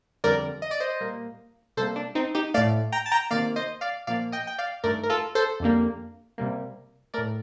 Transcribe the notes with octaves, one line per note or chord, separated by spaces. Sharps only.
F2 D3 G3 A#4 D5
D#5
D5
C5 D#5
A#2 G3 A#3
C3 G3 A#3 A4 C5
D4
C4 D#4
D#4 G4
A2 A3 D5 F5
G5 A#5
A5
G5 A#5
C3 D#3 A#3 D5 F5
C5 D#5
D5 F5
A#2 F3 A#3 D5 F5
D#5 G5
G5
D5 F5
G2 D#3 A3 A#4 D5
A#4
F4 A4
A4 C5
F2 D3 G3 A#3
C3 G3 A#3
A2 A3 A#4 D5